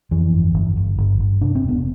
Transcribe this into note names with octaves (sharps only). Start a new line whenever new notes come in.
F2 E3
G1
G1
G1
G1
G1
C3 D4
C4
E1
B3